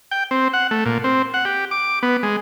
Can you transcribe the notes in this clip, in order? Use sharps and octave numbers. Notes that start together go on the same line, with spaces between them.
G5
C4
F#5
A3
A#2
C4
F#5
G4
D6
B3
G#3